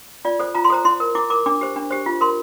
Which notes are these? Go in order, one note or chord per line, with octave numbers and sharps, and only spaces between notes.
F4 D5
A4 C5
F4 A#5
C6
A4 C5 A#5
E4 C6
A#4
E4 D6
A#4 D6
D4 D6
G4 C5
D4
G4 C5
F4
A#4 C6